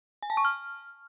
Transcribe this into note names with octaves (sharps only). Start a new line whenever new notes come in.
G#5
A5
C#6
F6